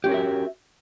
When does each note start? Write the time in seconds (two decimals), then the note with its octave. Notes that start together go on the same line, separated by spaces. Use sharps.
0.04 G4
0.06 C#4
0.09 A#4
0.12 F#4
0.14 E5